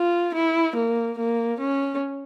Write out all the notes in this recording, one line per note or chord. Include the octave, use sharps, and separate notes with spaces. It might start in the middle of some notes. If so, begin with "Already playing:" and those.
Already playing: F4
E4
A#3
A#3
C#4